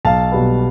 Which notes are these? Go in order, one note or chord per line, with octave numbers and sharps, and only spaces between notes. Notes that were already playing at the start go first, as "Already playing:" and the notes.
B1 F5 A5
B2 G3 B3